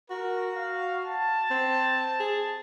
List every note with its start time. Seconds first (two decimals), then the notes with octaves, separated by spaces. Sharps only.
0.10 F#4 A#4
0.55 F5
1.05 A5
1.51 C4
2.20 G#4